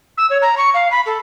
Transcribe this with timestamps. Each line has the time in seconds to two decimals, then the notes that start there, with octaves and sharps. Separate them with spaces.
0.17 E6
0.30 C#5
0.42 A#5
0.57 C#6
0.74 F5
0.91 B5
1.06 A4